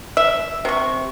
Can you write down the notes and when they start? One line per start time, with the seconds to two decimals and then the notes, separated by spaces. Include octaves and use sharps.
0.17 E5
0.65 C3 C#6